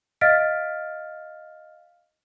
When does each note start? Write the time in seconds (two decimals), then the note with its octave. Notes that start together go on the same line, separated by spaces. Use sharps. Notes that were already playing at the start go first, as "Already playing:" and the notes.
0.21 D#5 F5 F6 A6 B6 D7